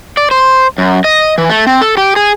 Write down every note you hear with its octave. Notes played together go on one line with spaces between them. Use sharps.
D5
C5
F#2
D#5
E3
A3
C4
A4
G4
G#4